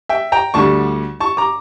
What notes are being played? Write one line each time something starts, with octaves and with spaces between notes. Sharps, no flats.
E5 G5
G5 A#5
D2 D3 G3 A5 C#6
A5 C#6
A#5 D6